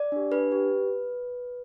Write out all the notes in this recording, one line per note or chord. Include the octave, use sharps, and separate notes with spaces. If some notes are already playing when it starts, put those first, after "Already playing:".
Already playing: D5
D4 G4
D4 B4
G4